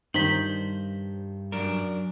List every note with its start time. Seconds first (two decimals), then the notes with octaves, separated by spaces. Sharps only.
0.14 G2 D#3 C5 B6 F#7
1.52 F#2 D4 A#4